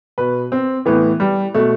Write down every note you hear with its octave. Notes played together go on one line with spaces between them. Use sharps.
B2 B4
C4
A2 E3 B3
G3
B2 A3